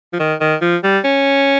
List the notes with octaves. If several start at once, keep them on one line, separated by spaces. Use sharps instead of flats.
F3
D#3
D#3
F3
G3
C#4